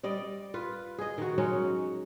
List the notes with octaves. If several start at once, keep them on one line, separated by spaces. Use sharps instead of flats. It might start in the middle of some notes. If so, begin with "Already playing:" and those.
G3 D5 D#5
F4 B4
G#4 D#5
D#3 F#4
F#3 G#3 C#4 D#4